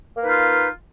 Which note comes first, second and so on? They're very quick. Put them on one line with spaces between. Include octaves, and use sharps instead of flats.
A#3 B4 D#4 F4